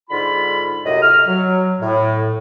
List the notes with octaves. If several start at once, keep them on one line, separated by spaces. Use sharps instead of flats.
G#2 D3 F4 B5
F#2 A2 C3 D#5
F6
F#3
A2